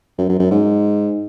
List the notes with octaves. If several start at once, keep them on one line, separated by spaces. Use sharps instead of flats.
F#2
F#2
F#2
G#2